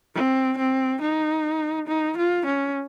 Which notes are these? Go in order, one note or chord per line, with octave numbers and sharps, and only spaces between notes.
C4
C4
D#4
D#4
F4
C#4